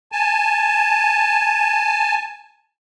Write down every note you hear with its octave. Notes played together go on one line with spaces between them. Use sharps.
G#5 A5